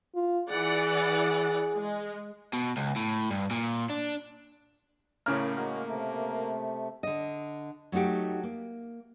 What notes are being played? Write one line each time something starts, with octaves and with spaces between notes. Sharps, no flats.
F4
E3 G#4 D5 F#5
G#3
B2
C#2
A2
G2
A#2
D4
A2 C#3 A#3 F6
G#3 A#3 F#4
C3 A3
D3 D#5
F#3 A3 D#4 F#4 G4
A#3